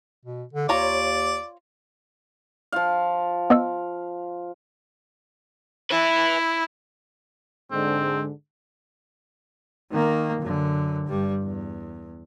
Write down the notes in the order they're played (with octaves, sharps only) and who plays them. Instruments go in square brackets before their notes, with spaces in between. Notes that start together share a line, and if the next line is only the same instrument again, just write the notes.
[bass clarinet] B2
D3
[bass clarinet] D#2 [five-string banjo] F4 C#5 A#5 [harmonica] D5
[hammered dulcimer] F3 F4 F5
[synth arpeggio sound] B3 D#5 E6
[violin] E4 [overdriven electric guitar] B4 E5
[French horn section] G#2 D3 G#3 [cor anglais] C4
[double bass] D#3 A#3
F#2 D3
G2 G3
E2